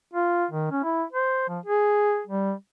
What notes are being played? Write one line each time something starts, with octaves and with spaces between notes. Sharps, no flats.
F4
D#3
C#4
E4
C5
F3
G#4
G3